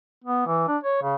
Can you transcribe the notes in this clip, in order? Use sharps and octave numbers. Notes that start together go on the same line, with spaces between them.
B3
E3
D4
C#5
C#3